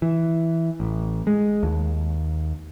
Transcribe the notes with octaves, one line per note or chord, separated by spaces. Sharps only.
E3
A1
G#3
D#2